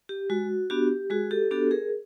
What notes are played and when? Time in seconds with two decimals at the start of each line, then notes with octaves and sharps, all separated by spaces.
0.09 G4
0.30 G#3 F#4
0.70 B3 D4 F#4 G4
1.10 G#3 F#4 G#4
1.31 G4 A4
1.51 B3 D4 F#4 G4 A4
1.71 G#4 A#4